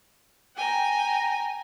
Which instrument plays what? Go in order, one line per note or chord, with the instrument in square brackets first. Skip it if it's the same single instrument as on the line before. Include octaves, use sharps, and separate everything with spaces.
[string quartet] G5 G#5 A#5